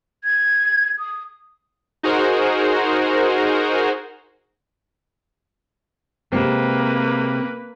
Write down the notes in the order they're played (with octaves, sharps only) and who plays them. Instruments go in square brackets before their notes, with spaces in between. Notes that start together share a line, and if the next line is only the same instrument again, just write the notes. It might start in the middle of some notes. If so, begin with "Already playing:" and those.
[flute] G#6
D#6
[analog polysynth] D#4 F#4 G#4 A#4 C5
[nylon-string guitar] C3 G#3 C4 [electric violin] A#3 B4